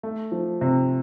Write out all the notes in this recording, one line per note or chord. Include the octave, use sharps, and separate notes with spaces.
A3
F3
C3